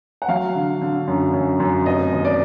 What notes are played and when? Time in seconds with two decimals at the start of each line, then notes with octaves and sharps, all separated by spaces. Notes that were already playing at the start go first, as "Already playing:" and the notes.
0.22 F#5
0.28 F#3 F5
0.55 D3
0.81 D3
1.07 F#2
1.33 F#2
1.60 F#2
1.86 F1 D#5
2.12 D#2
2.25 D5